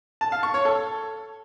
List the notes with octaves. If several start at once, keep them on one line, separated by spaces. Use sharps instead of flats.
A5
F5
C#6
C#5
A4